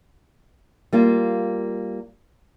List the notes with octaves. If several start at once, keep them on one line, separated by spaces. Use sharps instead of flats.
G3 A#3 F4